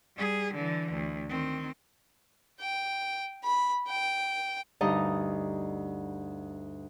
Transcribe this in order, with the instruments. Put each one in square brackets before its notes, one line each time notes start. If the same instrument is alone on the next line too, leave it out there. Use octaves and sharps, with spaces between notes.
[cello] G3 G#4
D3 E3
D2
D#3 C4
[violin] G5
B5
G5
[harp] D2 G2 D#4 D#5 A5 A#5